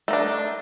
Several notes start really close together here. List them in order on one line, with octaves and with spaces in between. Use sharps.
A3 D#4 D4